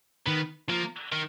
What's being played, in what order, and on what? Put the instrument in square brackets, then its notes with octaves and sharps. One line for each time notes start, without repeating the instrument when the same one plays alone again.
[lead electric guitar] D#3 [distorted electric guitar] B3
[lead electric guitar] F3 [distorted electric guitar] A#3
[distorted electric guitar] D#3